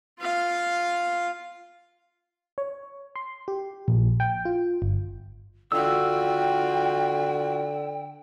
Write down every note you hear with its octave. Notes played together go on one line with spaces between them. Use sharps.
F4 F5
C#5
C6
G4
A#1
G5
F4
G1
D3 F4 F#4 G5 E6